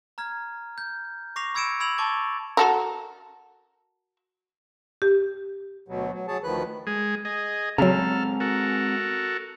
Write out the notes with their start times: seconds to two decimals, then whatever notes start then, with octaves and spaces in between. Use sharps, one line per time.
0.18 A#5 F6 G#6
0.78 G6
1.36 C#6 D6 A#6 C7 F7
1.55 B5 E6 G#6 C#7 D7 E7
1.80 B5 E6 G#6 D7 F7 F#7
1.98 A5 C#6 D6 G#6 A6
2.57 F#4 A4 A#4
5.02 G4
5.88 D2 B2 F#3
6.13 F#3
6.28 F#3 G#4 C#5 A5
6.43 D2 D#3 F3 B4 F#6
6.87 G#3 G#4
7.25 G#4 D#5
7.78 C#3 F#3 G#3 C4 A4 A#5 F6
8.40 F#4 A4 A#4